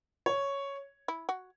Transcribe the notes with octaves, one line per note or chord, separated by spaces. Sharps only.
C#5
E4
F#4